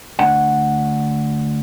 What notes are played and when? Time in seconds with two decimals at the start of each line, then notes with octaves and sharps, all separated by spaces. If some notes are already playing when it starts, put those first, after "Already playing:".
0.19 D2 D4 F#5